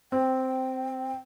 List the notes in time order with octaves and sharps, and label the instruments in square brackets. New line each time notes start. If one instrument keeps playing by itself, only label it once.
[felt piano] C4 [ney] G5